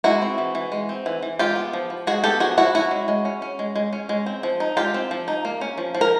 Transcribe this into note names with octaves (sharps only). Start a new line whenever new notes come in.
G#3 E4 F#4
C4
E3
E3
G#3
C4
E3
E3
G#3 F4 G4
B3
F3
F3
G#3 F#4 G#4
B3 G4 A4
F3 F#4 G#4
F3 E4 F#4
C#4 E4 F#4
G#3
G#3
C#4
C#4
G#3
G#3
C#4
G#3
C4
F3
D#4
G#3 F4 G4
C4
F3
D#4
A#3
C#4
F3
F3
A#4